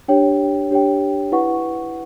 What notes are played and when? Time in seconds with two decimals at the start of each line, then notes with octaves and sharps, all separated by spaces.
0.08 D4 G4 C#5 G5
0.71 D4 G4 C#5 G5
1.32 E4 B4 F#5 C#6